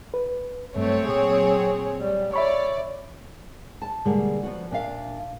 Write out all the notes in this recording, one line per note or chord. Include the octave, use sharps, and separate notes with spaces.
B4
G2 F#3 A3 C4 C#5
A#2 G#4
G3
C#5 D5 E5 B5 C#6
A5
B2 D3 G3 G#3 A#3
F3 B3 F#4
A#2 D4 E5 F5